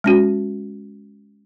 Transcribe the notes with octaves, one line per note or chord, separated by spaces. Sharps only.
G#3 C#4 F#4